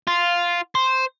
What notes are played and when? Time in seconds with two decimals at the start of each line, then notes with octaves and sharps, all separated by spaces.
0.07 F4
0.75 C5